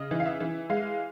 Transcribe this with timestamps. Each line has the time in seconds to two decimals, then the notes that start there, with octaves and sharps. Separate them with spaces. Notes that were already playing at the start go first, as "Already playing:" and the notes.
Already playing: C#3 D#5
0.11 E3
0.20 F5
0.26 E5
0.40 E3
0.70 G#3 F5